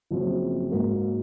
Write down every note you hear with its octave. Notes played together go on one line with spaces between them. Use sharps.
F#1 F#2 F3 C4
G#2 F#3 A#3